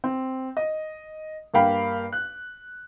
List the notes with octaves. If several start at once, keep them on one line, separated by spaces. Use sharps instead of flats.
C4
D#5
G2 A#3 F5 G5 B5
F#6